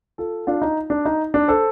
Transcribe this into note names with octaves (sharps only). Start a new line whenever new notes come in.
F4 A4
D4 F4
D#4
D4
D#4
D4
A4 C5